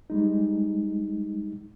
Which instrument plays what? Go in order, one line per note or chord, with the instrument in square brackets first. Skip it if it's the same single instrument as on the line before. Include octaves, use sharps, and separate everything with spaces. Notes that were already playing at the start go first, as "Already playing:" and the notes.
[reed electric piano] G3 G#3 D#4